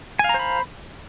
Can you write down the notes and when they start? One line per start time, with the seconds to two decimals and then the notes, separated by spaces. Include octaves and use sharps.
0.19 G#5
0.24 F5
0.29 A#5
0.34 C5
0.39 B5